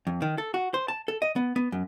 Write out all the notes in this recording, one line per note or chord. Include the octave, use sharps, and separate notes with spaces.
F2
D#3
A4
F#4
C5
A5
A4
D#5
B3
B3
F#2